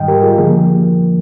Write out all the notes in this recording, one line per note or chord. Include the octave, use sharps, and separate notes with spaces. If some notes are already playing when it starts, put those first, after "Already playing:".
Already playing: G#2 D#3 G3 D#5 G5
G4 A#4
F4 G#4
D3 F3 A#3
A#3